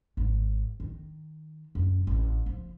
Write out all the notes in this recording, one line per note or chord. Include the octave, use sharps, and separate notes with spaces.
G#1
D#3
F#2
A1
F3